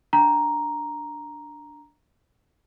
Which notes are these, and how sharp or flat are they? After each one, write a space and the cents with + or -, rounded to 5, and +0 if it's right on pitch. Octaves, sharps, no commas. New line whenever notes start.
D4 +0 A#5 +5